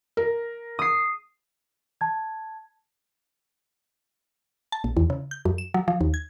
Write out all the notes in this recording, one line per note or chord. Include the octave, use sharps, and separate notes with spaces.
A#4
D#6 C7
A5 G#6
A5
A#1
E2
C#3
G6
F#2
E7
F#3
F3
D#2
G#6